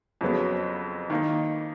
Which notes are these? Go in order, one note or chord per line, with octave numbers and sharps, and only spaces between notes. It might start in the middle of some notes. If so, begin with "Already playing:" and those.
F2 C#3 F#3 B3
D#3 A#3 D#4